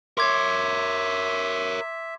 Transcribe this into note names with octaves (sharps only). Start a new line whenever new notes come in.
A#4 C#5 E5 C6 D6 G#6